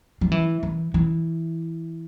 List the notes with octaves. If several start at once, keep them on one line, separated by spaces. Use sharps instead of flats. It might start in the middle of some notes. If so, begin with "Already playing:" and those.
F3
E3
E3
E3